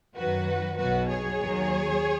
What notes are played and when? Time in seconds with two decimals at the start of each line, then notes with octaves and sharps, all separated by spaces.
0.16 F#2 D#3 F#3 F#4 B4
0.78 B1 B2 F#3 F#4 B4
1.09 G#4 C#5
1.40 D#2 D#3 F#3